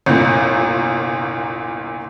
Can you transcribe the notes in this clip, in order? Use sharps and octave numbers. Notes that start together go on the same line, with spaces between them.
G1 C2 A#2